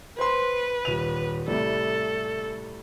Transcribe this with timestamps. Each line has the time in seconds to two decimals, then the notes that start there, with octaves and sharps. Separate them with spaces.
0.19 B4 C5 C6
0.85 D#1 D#7 F7
1.48 A2 C3 G3 A4